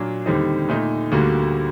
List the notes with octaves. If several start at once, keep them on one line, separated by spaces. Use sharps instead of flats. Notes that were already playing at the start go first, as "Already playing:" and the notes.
Already playing: A#2 F#3 A#3 D4
D#2 D3 G3 C4 D#4
A#2 A3 D#4
D2 D3 G3 A#3 F#4